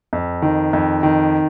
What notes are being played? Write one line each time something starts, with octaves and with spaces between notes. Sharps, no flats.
F2
D#3
F2
D#3